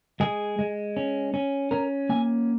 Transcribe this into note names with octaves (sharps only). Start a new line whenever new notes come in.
G#3 G#4
G#3
C#4
C#4
C#4 A#4
A#3 G#5